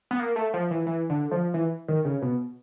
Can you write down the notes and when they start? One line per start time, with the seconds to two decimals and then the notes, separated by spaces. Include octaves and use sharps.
0.11 B3
0.19 A#3
0.36 A3
0.54 F3
0.71 E3
0.86 E3
1.10 D3
1.31 F3
1.54 E3
1.88 D#3
2.05 C#3
2.22 B2